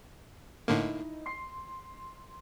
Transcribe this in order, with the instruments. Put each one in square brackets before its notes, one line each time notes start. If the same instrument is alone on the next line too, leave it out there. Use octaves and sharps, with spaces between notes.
[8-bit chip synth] A2 D3 A#3 [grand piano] D#4 E4 D#5
[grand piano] C6 C7